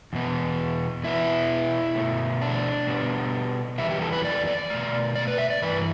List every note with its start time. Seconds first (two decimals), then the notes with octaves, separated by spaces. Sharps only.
0.13 E2 B2 B3
1.04 B2 B3 E4
1.95 B2 A3
2.42 D4
2.87 B2 G3 B3
3.78 E2 E3 G3 B3 E4
3.91 G4
4.02 A4
4.13 B4
4.25 D5
4.47 D5
4.70 B2 A3
5.15 D5
5.28 B4
5.38 E5
5.50 D5
5.62 G2 E3 B4